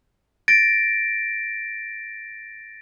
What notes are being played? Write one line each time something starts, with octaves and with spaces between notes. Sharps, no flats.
A6 A#6 D7